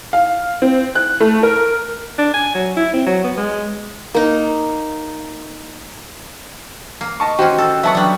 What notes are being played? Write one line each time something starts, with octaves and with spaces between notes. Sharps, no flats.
F5
C4
F#6
A3
A#4
D4
G#5
F#3
E4
C4
F#3
B3
G#3
A#3 D#4
A#3
D#5 A5 C#6
D#3 C#4 F#4 G4 C5
A4
F#3 B3 E5 A5 C#6
F#3 G3 D4